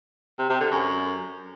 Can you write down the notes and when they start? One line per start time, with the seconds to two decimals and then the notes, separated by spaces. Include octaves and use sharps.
0.39 C3
0.50 C3
0.61 D3
0.72 F#2